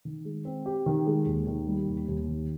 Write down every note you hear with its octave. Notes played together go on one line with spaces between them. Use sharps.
D#3
G#3
C4
G4
D#3
G#3
D#2
D#3
G3
D#2
D#2
D#3